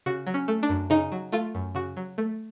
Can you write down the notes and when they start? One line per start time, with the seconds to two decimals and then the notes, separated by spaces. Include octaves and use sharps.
0.06 C#3 F#4
0.27 F#3
0.34 C#4
0.48 A3
0.63 D4
0.69 F#2
0.90 C#3 D#4
1.12 F#3
1.32 A3 F4
1.55 F#2
1.75 C#3 F#4
1.97 F#3
2.18 A3